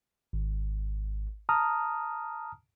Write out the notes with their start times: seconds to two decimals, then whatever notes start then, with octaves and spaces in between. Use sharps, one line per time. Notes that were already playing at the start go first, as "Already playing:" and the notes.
0.33 G#1
1.49 A5 A#5 D#6 F6